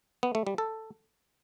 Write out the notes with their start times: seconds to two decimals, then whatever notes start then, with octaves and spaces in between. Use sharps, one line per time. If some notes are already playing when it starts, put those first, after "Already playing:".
0.23 B3
0.35 A3
0.47 G3
0.58 A4